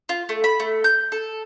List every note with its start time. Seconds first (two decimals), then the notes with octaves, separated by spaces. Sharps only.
0.09 F4
0.29 A3
0.44 B5
0.60 A3
0.84 G6
1.12 A4